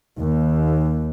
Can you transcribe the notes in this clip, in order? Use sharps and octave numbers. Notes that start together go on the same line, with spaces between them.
D#2